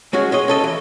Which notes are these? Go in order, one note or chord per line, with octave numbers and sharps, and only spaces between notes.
G#3 C#4 F#4 G#4
G#3 C#5 D#5
C#4 A4 D#5
E3